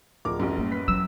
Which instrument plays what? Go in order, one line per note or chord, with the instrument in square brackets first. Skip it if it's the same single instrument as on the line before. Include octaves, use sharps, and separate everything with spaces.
[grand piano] D1 F3 A#4 [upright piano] D6
[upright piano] A1 F#2
[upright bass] G3 A#3
[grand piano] B4 B6
[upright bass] F#3 C#4 [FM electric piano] E6